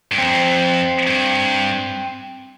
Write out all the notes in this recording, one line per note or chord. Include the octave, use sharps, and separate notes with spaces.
G2
F2 C4
G2